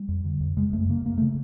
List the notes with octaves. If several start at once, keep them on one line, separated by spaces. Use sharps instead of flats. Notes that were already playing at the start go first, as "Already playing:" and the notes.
Already playing: G3
F2
D3
F2
C#3 G#3
F#2 A3
C#3 A#3
F#2 A#3
A3
C#3